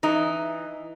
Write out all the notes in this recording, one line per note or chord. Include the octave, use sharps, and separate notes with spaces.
E3 D#4